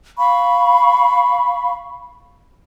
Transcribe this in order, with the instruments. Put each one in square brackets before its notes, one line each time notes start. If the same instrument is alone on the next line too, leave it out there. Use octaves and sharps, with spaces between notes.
[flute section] F5 B5 C#6